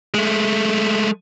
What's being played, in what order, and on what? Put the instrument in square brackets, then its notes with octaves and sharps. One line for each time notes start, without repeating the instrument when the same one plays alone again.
[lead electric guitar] G#3 A3